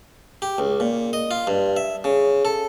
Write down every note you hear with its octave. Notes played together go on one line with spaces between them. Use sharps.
G4
C#2
A#2
D#5
F4
G2
E5
C#3
A4